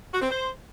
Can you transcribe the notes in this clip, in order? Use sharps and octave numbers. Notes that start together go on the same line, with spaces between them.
F#4
C4
C5